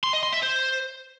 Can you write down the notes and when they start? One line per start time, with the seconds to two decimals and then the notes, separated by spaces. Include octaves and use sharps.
0.03 C6
0.13 D#5
0.23 C6
0.33 E5
0.42 C5